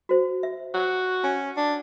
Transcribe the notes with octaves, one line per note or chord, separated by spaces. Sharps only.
F#4 C5
E5
F#4
C#4 G#5
D4